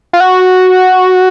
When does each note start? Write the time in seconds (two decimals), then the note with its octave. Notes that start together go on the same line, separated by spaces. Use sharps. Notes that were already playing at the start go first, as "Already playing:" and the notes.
0.13 F4
0.20 F#4